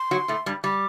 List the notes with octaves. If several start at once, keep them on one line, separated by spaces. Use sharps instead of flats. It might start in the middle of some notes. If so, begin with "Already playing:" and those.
Already playing: C6
F#3 F#4
A2 A3
G2 G3
G3 D6